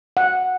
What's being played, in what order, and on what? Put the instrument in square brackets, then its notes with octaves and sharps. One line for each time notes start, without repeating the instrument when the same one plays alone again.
[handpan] F#5